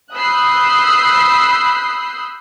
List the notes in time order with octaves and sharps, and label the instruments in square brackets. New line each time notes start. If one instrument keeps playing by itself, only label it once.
[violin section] B5 D#6 E6 F#6 G6 C7